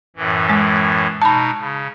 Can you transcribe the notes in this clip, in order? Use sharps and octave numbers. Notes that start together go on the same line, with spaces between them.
F#2 A2 E3
G#3
B2 D#4 A5 B5
C#3